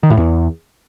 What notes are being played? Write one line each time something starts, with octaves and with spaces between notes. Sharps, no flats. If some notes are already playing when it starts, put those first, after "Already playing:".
D#3
A2
E2